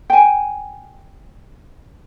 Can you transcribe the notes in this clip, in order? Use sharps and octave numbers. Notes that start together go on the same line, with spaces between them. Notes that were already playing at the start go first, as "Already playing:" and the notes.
G5 G#5